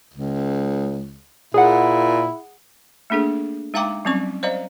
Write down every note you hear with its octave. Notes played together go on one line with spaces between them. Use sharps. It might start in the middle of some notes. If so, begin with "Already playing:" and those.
C#2
A#2 E4 G#4 F#5
A3 A#3 D4 G#4 A4
G#3 D#4 F5 G5 A#5 D6
F#3 G3 C4 C#4 C#6
C5 D5 D#5 F5 A#5